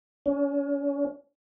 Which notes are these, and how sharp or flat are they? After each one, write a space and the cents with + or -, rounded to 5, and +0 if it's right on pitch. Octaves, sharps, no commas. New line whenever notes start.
C#4 +35